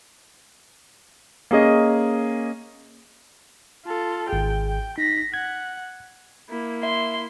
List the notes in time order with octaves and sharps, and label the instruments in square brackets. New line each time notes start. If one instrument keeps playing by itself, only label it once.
[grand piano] A#3 C#4 G#4 D#5
[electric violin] F4 A4
[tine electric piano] G#1 G#4 [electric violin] G5
[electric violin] G5
[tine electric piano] D#4 [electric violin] A#6 B6
[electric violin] F#5 [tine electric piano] G#6
[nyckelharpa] A#3 E4
[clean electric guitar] E5 [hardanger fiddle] C6